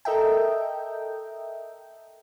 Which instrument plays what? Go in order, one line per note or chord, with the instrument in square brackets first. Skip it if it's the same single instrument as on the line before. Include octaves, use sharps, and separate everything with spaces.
[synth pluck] A4 A#4 D#5 E5 G5